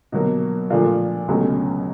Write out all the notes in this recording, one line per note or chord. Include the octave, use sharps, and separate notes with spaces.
B2 F#3 A#3
A#2 F3 A3 D4 F4
C#2 B2 F#3 A3 C#4